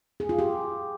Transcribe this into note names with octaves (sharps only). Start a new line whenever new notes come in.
G#4
F4
G4